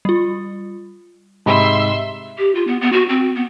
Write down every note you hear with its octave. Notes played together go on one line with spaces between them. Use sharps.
G3 F4
G#2 C3 E5 B5 C6 E6
G4
F4
B3
B3
F#4
C4
B3